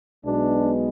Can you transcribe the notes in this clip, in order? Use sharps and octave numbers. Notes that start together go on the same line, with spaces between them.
B1 B2 G#3 B3 D4